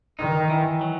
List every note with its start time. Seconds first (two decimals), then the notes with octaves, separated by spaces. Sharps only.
0.19 D#3 D#4
0.50 E3
0.81 F#3